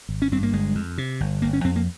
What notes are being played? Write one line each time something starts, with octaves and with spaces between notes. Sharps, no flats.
G#1
C#4
G2 C4
A#3
G1 G#3
F2
C3
G1
G1 A#3
C#4
F2 C4
A#3